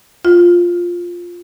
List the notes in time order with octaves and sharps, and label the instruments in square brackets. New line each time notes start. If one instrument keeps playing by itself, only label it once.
[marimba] F4